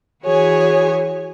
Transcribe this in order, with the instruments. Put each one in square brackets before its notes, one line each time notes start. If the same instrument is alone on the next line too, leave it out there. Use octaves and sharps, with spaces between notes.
[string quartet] E3 F#4 G#4 C#5 G#5